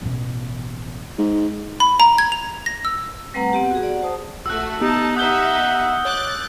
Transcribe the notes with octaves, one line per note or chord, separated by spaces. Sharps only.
A1 B2
G#2
B5
A#5
G#6
F7
A#6
E6
G3 A3 C4 B4 F#5 A#5
B3 C4 G4 F#5
F#4 G#4
D5 F#5
C5 A5 D#6
A#1 A3 F#4 E6 F#6
B3 D#4 G4 A5
D#4 E5 F#5 D#6 G6 G7
C#5 D6 F#6 A6